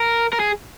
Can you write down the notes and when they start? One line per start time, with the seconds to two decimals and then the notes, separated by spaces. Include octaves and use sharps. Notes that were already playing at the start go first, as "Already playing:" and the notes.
Already playing: A#4
0.33 A#4
0.40 G#4